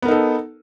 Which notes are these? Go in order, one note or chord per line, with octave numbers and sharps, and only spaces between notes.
B3 D#4 A4 A#4